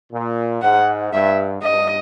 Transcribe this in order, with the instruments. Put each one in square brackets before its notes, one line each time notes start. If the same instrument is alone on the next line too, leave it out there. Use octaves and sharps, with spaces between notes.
[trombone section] A#2
[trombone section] G#2 [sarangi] F#5
[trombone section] G2 [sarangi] E5
[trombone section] G2 [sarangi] D#5